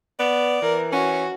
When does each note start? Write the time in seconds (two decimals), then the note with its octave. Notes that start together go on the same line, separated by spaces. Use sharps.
0.19 B3 D5
0.62 E3 A#4
0.92 C#4 F#4